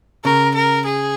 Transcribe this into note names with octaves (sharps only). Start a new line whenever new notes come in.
C#3 A#4
A#4
G#4